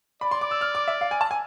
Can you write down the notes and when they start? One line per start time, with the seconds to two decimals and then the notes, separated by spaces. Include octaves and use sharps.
0.21 D5 B5
0.31 C6
0.41 D6
0.51 E6
0.61 F6
0.75 D6
0.88 E5
1.01 F5
1.11 G#5
1.21 A5
1.31 G#5